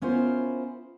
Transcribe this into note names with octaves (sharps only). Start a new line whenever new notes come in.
B3 C#4 E4 F4 A#4 C5